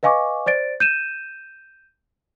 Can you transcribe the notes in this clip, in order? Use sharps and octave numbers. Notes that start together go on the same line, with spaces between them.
B4 D#5 F5 G#5 C#6 D6
C5 D5 A6 D7
G6 D#7 E7